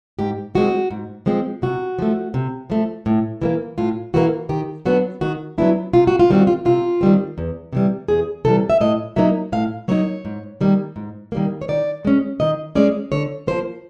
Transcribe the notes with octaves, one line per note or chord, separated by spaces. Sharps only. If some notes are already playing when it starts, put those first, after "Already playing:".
G#2 G4
F3 G#3 C4 F#4
G#2
F3 G#3 C4
C3 F#4
F3 A3
C3
F3 A3
A2
E3 G3 A#3
A2 F4
E3 G3 A#3 F#4
D#3 G4
F#3 B3 D4 F#4
D#3 F#4
F#3 B3 D4 E4
C3 F4
F#4
F4
D#3 G3 C4 F#4
F4
C3 F4
D#3 G3 C4
E2
C3 E3 G3
E2 G#4
C3 E3 G3 A4
E5
A2 D#5
F#3 A#3 D#4 E5
A2 F5
F#3 A#3 D#4 C#5
G#2
D#3 G3 A#3
G#2
D#3 G3 A#3
C#5
D#3 D5
G#3 C#4
D#3 D#5
G#3 C#4 D5
D3 C#5
F3 A#3 C5